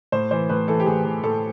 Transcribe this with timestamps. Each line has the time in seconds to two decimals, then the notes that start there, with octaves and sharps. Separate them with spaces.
0.12 A2 C5
0.31 E3 C5
0.49 A2 B4
0.68 E3 A4
0.80 G4
0.86 A2 G#4
1.05 E3
1.24 A2 A4